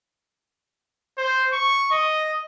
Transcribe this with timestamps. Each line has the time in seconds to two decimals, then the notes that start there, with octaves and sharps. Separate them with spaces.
1.18 C5
1.53 C#6
1.91 D#5